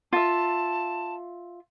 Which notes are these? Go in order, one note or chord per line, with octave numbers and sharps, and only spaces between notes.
F4 E5 A5